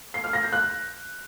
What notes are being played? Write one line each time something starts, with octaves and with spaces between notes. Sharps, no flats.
C7
F6
A#6
G6
F#6